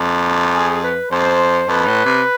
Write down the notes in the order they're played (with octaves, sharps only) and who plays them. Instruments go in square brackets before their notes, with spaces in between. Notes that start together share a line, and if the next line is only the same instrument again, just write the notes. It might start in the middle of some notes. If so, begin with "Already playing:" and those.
Already playing: [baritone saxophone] F2
[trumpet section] G#4
B4
[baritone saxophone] F2 [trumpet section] C5
[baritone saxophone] F2 [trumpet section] B4
[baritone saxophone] A2
C3